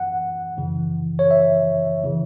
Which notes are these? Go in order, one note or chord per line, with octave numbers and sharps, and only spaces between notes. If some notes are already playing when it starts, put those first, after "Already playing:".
Already playing: F#2 E3 F#5
F#2 C#3 E3
C#5
E5
C#3 E3